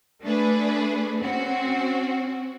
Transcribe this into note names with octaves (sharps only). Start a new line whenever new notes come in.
A3 D4 G#4 B4
C4 C#4 F#4